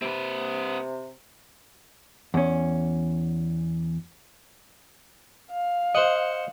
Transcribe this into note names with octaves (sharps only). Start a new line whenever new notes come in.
C3 C4 B4
E2 C#4
F5
C5 D#5 F#5